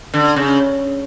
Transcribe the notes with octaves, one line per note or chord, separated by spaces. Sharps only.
D3
C#3